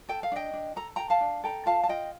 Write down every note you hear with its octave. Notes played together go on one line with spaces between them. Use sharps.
A4 G5
F5
D4 D#5 G5
D4
A4 A#5
A4 G5 A#5
F5 A5
D4
A4 G5 A#5
F4 F5 A5
A5
F4 D#5 G5